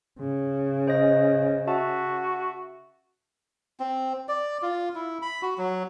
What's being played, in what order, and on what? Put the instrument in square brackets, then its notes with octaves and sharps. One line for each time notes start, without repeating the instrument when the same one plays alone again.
[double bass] C#3
[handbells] C5 D#5 A#6
[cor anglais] F#4 [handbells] E5 A5
[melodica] C4
D5
F4
E4
B5
F#4
F#3